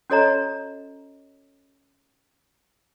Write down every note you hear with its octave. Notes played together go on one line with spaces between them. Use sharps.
C#4 F#4 A4 C#5 D#5 A#5